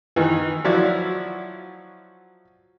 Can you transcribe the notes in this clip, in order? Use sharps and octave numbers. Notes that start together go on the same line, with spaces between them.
D#3 E3
F3 F#3 E4 F#4 D5